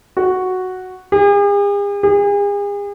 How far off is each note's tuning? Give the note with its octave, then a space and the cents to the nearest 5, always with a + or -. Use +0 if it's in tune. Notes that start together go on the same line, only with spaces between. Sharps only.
F#4 +0
G#4 -45
G#4 -40